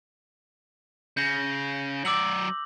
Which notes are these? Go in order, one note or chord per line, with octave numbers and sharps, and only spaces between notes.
C#3 G6 A#6
F#3 D5 D6 E6 F#7